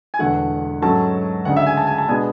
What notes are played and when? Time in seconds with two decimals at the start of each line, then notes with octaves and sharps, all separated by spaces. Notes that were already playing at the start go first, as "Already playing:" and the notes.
0.14 G#5
0.19 E1 E2 D3 A3 F#5
0.82 G#2 F#3 A3 C#4 A5
1.45 D2 C#3 G#3 D4 F#5
1.57 E5
1.66 G#5
1.77 A5
1.87 G#5
1.98 A5
2.08 B2 G#3 B3 D4 G#5